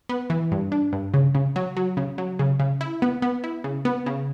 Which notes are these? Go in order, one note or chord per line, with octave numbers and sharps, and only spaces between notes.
B3
E3
G2
D4
G2
C#3
C#3
F#3
F#3
C#3
F#3
C#3
C#3
E4
B3
B3
E4
C#3
B3
C#3